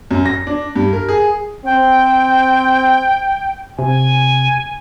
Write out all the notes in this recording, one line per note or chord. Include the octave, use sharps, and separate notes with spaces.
F#2
A#6
D4
G2
A#4
G#4
C4 G5
C3 G#5